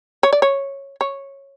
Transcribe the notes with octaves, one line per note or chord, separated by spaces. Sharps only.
C#5
D5
C#5
C#5